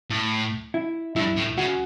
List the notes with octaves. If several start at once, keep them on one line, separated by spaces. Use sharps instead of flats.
A2
E4
G2 E4
A2
C#3 F#4